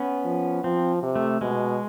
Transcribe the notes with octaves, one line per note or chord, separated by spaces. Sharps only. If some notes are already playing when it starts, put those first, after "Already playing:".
Already playing: B3 C#4
F3
F3 C4
C3
A3
B2 G#3